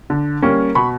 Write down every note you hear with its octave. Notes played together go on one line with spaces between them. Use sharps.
D3
G3 A#3 C#4
B2 B5 C#6